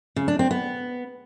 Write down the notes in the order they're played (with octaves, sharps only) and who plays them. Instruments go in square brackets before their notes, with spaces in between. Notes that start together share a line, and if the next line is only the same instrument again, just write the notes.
[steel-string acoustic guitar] C#3
D4
C4
B3